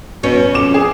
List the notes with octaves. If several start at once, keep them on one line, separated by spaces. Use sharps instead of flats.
B2 C#4
F2 D6 E7
G#4